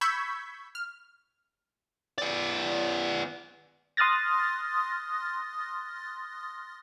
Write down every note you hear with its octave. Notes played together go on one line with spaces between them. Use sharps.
B5 C#6 E6 G6 G#6 B6
F6
B3 D5
C6 D#6 F6 F#6 A6 A#6